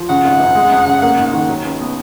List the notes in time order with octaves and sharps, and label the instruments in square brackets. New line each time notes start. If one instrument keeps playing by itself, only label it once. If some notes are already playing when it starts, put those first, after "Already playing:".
Already playing: [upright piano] F3
[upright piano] C#3 [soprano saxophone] F#5
[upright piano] G#1
F#2
G#3
F2
C#3
[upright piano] A#3 [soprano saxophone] F#5
[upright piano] G#2
[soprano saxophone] F#5
[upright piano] D#3
F#3
C#2
B2